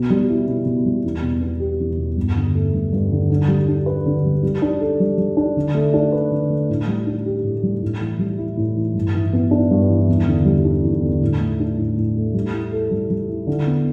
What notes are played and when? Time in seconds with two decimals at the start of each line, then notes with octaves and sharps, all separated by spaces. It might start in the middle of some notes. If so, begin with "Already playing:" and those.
Already playing: B2
0.10 G3
0.29 E4
0.47 B2
0.65 B2
0.85 G3
1.04 E2
1.22 B2
1.41 B3
1.60 G4
1.80 E2
1.98 B2
2.17 G2
2.36 D3
2.55 A3
2.73 G2
2.92 G2
3.12 D3
3.30 D3
3.48 G3
3.68 D4
3.86 B4
4.06 D3
4.25 G3
4.43 G3
4.62 D4
4.80 A4
5.00 G3
5.18 G3
5.37 D4
5.57 D3
5.75 A3
5.94 D4
6.12 B4
6.31 D3
6.50 A3
6.70 A2
6.87 G3
7.06 D4
7.26 G4
7.44 A2
7.63 G3
7.82 A2
8.01 E3
8.19 G3
8.38 E4
8.57 A2
8.76 E3
8.95 G2
9.15 E3
9.33 B3
9.51 D4
9.71 G2
9.90 E3
10.09 E2
10.27 D3
10.45 G3
10.65 D4
10.83 E2
11.03 D3
11.22 A2
11.41 A3
11.60 D4
11.77 A2
11.97 A2
12.16 A3
12.34 G3
12.53 E4
12.72 A4
12.91 G3
13.10 G3
13.28 E4
13.47 D3
13.67 B3